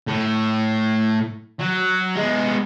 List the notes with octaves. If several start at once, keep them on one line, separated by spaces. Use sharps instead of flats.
A2
F#3
G#3 B3